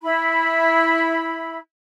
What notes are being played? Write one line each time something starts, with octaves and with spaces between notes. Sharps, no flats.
E4 B5